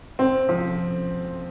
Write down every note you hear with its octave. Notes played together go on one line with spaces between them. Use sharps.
C4
F3